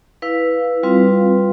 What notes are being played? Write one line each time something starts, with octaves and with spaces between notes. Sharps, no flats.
E4 B4 F5
G3 C4 F4 B4 F5